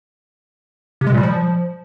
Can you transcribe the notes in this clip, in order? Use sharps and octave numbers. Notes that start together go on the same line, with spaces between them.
C3
G#3
A#2
G3
F3